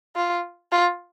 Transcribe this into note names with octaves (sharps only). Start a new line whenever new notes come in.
F4
F4